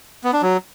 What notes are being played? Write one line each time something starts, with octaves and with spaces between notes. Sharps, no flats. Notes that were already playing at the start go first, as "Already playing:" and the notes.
B3
D4
F#3